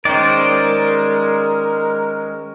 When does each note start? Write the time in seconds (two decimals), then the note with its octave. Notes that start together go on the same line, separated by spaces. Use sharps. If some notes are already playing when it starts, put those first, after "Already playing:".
0.05 D#3 G#3 C#4 A#4 C5 D5